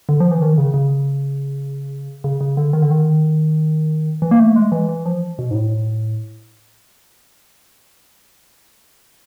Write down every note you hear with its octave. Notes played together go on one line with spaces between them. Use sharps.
D3
F3
E3
D#3
C#3
C#3
C#3
C#3
D3
D#3
D3
D#3
E3
A#3
A3
G#3
E3
E3
F3
B2
G#2
A2